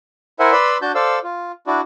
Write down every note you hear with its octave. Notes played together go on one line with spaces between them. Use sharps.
E4 A#4 C5 E5 F#5 G#5
B4 D5 B5 C6 E6
D4 F#4 A5 G6
A4 C5 D5 F5 E6
F4
D4 E4 F#4 D5